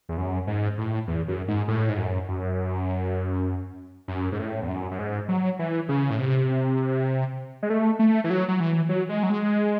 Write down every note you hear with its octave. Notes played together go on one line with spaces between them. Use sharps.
E2
F#2
G#2
A2
E2
F#2
G#2
A2
G#2
F#2
F#2
F#2
G#2
A2
E2
F#2
F#2
G#2
F#3
E3
C#3
A2
C3
G#3
A3
A3
E3
F#3
F#3
E3
F#3
G#3
F#3
G#3